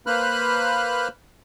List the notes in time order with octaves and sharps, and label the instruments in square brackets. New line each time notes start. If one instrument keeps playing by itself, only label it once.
[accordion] A#3 B4 C5 B5 F6 F#6